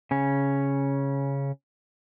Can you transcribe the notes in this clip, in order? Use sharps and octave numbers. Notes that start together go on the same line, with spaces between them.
C#3 C#4